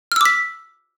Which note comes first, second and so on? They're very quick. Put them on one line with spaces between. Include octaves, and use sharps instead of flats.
F6 E6 D6 B6